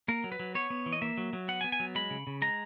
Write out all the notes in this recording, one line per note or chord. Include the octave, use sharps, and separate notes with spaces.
A#3 A#4
F#3
B4
F#3
B3 C#5
B3
E3
D#5
A#3 E5
F#3
F#3
B3 F#5
G#5
B3
G#5
F#3
G#3 B5
C#3
C#3
G#3 A#5